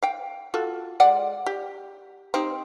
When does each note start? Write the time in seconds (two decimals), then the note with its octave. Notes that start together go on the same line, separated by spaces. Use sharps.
0.03 F5 G5
0.54 F4 F#4 A4
1.00 G#3 D5 F#5
1.46 G4
2.34 C4 D#4 G4